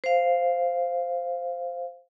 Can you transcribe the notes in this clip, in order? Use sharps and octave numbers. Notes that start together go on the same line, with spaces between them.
C5 F5